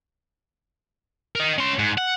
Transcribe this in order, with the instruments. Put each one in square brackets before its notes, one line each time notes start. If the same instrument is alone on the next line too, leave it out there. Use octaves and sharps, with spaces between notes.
[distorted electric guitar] A#4 D#5
C#4 C6
G#2
F#5